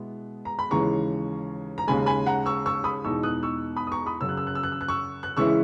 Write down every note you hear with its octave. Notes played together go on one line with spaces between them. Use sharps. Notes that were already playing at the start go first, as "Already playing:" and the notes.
Already playing: B2 G#3 B3 E4
A#5
B5
D#2 C#3 E3 G#3 A#5 C#6
A#5
D#2 C#3 G#3 G#5 B5
G#5 B5
F#5 A#5
C#6 E6
C#6 E6
B5 D#6
E2 B2 G#3 D#4 C#6 E6
D#6 F#6
C#6 E6
B5 D#6
D#6
A#5 C#6
B5 D#6
F#2 C#3 F#3 E6
F#6
E6
F#6
E6
F#6
E6
F#6
C#6 E6
F#6
C#3 E3 G#3 C#4 E4 C#6 E6